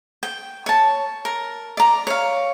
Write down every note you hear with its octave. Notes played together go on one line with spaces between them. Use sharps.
G5
C#5 A5
A#4
D5 A#5
C#5 F5